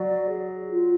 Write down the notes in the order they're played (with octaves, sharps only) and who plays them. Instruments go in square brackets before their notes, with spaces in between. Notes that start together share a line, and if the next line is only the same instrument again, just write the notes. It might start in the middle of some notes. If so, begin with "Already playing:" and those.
Already playing: [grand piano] F#3 [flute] D5
[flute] G#4
F4